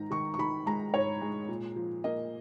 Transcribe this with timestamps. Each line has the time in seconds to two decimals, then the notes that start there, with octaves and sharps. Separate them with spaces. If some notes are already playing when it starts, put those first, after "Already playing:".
Already playing: G#2 D#3 A#5
0.11 D#3 C#6
0.34 C#6
0.39 D#3 B5
0.66 G#3 A#5
0.94 G#2 C#5
1.21 G#3
1.48 A#2
1.76 F3
2.04 A#3 D#5